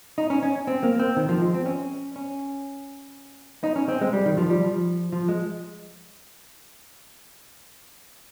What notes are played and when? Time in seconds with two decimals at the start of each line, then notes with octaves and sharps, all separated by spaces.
0.18 D#4
0.30 C#4
0.43 C#4
0.67 C4
0.83 A#3
1.00 C4
1.17 D#3
1.29 F3
1.41 G#3
1.54 C4
1.66 C#4
2.16 C#4
3.64 D#4
3.76 C#4
3.88 C4
4.01 G#3
4.13 G3
4.26 D#3
4.38 F3
4.50 G3
4.63 F3
5.12 F3
5.29 G#3